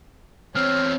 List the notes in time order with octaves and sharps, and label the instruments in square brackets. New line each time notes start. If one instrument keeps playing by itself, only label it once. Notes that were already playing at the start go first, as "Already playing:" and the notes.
[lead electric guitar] E2 C4 [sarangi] C#5 [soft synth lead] F6